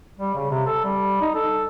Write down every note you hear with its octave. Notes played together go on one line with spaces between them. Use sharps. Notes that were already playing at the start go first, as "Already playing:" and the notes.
G3
C#3
C3
A4
G3
D#4
A4